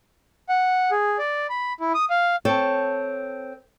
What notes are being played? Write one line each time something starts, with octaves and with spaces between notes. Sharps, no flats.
F#5
G#4
D5
B5
E4
D#6
F5
C4 A4 C#5